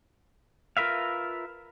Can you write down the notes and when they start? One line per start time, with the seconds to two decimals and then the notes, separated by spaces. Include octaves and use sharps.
0.77 F4 A#4 B4 E5 F5